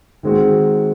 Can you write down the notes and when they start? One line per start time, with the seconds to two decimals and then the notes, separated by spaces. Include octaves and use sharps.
0.23 D#3 G#3 C4 F#4